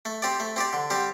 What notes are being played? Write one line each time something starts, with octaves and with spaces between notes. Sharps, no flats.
A3
C4 G4 D5
A3
C4 G4 D5
D3
G3 C4 G4